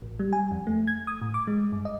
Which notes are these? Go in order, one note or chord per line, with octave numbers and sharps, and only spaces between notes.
A1
G3
G#5
F2
A3
G#6
D#6
A2
D6
G#3
G2
D#5